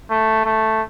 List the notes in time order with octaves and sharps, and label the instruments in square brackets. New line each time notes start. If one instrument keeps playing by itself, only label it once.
[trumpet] A3
A3